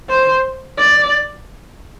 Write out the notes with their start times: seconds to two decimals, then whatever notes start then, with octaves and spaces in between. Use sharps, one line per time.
0.09 C5
0.77 D5